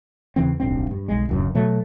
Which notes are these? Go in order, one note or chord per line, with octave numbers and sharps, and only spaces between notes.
E2 C#3 E3 C4
D1 B1 G2 C4
G2
B1 G#3
D1 F#2 C#3
B2 F#3 A3